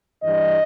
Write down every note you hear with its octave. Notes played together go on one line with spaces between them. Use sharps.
G2 E3 G3 D#5